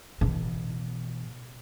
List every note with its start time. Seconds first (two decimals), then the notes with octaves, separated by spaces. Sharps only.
0.21 B2 E3